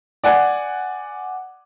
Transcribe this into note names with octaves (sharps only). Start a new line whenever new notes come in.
D5 F#5 G#5